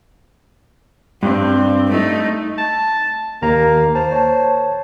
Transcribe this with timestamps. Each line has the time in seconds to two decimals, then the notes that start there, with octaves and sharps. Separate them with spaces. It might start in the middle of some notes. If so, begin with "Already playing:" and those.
1.23 G2 C4
1.90 A3 D#4
2.58 A5
3.42 D#2 A#3 A#5
3.95 C5 A5
4.12 C#5 A5